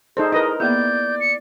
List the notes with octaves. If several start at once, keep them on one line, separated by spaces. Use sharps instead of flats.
D#4 G#4 A4 C5 D5
E4 A#4 B4 D#5
A#3 B3 E4 G#4 D5 G6
C#7